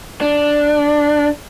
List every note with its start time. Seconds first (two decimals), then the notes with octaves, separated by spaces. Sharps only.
0.21 D4